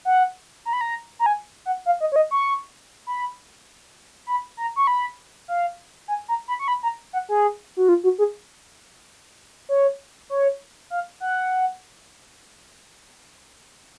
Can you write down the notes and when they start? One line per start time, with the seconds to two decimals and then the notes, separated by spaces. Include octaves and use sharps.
0.05 F#5
0.65 A#5
0.73 B5
0.81 A#5
1.19 A#5
1.26 G#5
1.66 F#5
1.86 F5
2.00 D#5
2.12 C#5
2.16 D#5
2.31 C#6
3.07 B5
4.27 B5
4.57 A#5
4.76 C#6
4.87 B5
5.48 F5
6.08 G#5
6.28 A#5
6.48 B5
6.59 C#6
6.68 B5
6.83 A#5
7.13 F#5
7.29 G#4
7.77 F#4
7.89 F4
8.04 F#4
8.18 G#4
9.69 C#5
10.30 C#5
10.90 F5
11.20 F#5